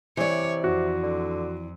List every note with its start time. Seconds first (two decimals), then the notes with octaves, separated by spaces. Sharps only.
0.17 C3 E3 C#5 D5
0.64 F2 F#4
1.03 D3